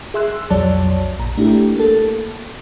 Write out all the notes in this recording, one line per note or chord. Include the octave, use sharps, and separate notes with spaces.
G#4 E5 C6 E6 F#6
B1 F2 F#3 C#5 D5 A5
A#1 A#5
A3 D4 E4 G4
A#3 A4